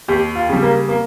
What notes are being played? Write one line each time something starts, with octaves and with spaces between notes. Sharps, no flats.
D#2 G4
F4
C#3 G3
A#3
A#3